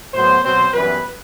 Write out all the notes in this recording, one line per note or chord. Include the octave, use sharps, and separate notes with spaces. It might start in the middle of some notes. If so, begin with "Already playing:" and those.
A2 F#3 B3 C5
B2 F#3 C4 C5
F#2 E3 G3 B3 B4